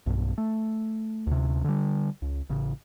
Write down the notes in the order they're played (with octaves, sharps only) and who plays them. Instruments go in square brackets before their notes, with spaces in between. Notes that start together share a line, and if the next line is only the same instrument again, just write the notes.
[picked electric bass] B1 G2
A3
D2 C3
D3 G3
C#2
A1 C#3